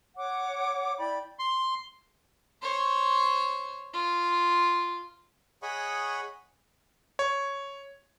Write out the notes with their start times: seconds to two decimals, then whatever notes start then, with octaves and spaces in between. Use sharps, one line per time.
0.17 C#5 F#5 D6
0.98 E4 D5 G5 B5
1.39 C6
2.62 C5 C#5
3.93 F4
5.63 G#4 C#5 D#5 F#5 B5 C#6
7.19 C#5